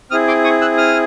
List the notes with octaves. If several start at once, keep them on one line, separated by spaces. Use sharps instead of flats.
C4 E4 G#4 D#6 F6
C6 D6
C#6 D#6
E6 F#6
D#6 F6